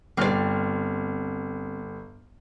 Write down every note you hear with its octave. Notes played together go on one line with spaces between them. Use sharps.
G1 C4 D5 F6